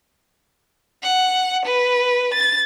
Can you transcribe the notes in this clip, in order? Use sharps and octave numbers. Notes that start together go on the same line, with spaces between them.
F#5
B4
A6